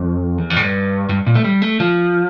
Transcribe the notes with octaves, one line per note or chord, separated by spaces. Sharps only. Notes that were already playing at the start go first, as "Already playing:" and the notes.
Already playing: F2
E2
F2
A2
G2
G2
A#2
A3
G3
A3
F3